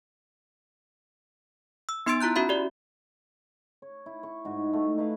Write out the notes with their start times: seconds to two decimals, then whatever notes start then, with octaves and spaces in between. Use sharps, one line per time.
1.89 E6
2.06 B3 D#4 C6 E6 A6 D7
2.20 E4 F4 A#5 F#6 G6
2.36 C#4 F#4 E5 B5
2.49 G4 D5
3.82 C#5
4.06 E4
4.23 C#6
4.45 G#2 F#4
4.73 A3 F#4
4.98 D#4 E4 B4 F5